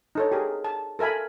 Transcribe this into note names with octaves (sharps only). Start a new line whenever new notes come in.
D#4 A4 C#5
G4 G#4 A#4
A5
A4 A#4 E5 G#5 B5